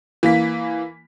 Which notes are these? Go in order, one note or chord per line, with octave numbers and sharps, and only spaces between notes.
E3 A#3 B6